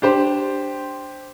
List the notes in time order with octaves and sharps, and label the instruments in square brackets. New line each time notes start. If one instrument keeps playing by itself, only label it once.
[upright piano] D4 G4 C5